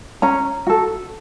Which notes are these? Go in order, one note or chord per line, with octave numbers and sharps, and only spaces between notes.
C#4 A#5
F#4 A4